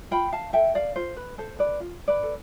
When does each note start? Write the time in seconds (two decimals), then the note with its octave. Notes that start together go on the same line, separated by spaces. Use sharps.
0.11 F4 G5 B5
0.32 F5 A5
0.53 A4 E5 G5
0.75 D5 F5
0.96 F4 C5
1.16 B4
1.38 A4 C5
1.59 B4 D5
1.80 F4
2.08 B4 D5
2.23 A4